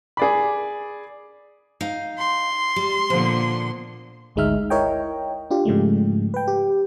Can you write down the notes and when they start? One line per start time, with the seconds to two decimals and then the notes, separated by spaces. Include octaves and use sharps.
0.17 G#4 D5 B5
1.81 D#4 F5
2.18 C6
2.76 G3
3.10 A#2 D3 F3 B3
4.36 G#1 D2 G#3 D#4 E5 F6
4.70 E4 A#4 C#5 D#5 G5
5.50 D4 F4 G4
5.65 G#2 C#3 F3 G#3 A3
6.34 B4 G5
6.48 G4